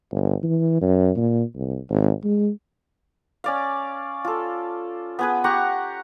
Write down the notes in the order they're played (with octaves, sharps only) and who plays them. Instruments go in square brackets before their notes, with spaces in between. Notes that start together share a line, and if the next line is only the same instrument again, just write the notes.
[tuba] G1
E3
F#2
A#2
C2
G#1
G#3
[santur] C#4 D5 F5
F4 A4
B3 G#4 B4
G4 F#5 A#5 C#6